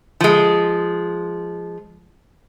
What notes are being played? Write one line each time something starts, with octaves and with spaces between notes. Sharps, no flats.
F3 G#3